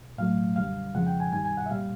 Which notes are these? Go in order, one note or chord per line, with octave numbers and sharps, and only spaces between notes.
A2 F#3 A3 F5
F#2 D3 G3 F5
F2 C#3 F3 G#3 F#5
G5
G#5
G2 D#3 G3 G#5
G#5
F#5
E5
C2 A#2 G3 F5